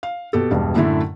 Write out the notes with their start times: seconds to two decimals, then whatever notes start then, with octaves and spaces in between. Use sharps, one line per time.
0.03 F5
0.33 B2 G4 A4
0.51 E1 G2 B2
0.75 F#2 A2 D3 A3 E4